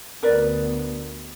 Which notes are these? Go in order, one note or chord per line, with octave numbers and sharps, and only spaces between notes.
D2 B3 A#4 B4 D5